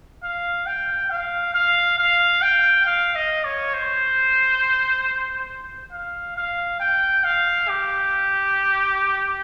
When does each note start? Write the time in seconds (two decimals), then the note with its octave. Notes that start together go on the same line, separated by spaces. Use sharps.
0.23 F5
0.66 G5
1.10 F5
1.54 F5
1.98 F5
2.42 G5
2.86 F5
3.15 D#5
3.45 C#5
3.74 C5
5.92 F5
6.36 F5
6.80 G5
7.24 F5
7.68 G4